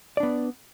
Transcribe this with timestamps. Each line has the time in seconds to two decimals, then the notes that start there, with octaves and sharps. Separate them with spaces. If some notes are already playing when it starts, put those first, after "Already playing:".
0.17 D5
0.20 D4
0.23 B3